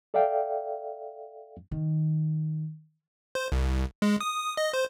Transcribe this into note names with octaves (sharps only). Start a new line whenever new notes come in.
A4 D5 E5 F5 G5
D#3
C5
C2
G#3
D#6
D#5
C5